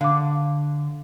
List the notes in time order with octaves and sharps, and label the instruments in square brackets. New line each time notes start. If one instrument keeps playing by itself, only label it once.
[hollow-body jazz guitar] D3 [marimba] F5 D6